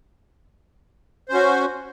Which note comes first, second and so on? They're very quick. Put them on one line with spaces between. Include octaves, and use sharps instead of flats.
C5 C#4 F#4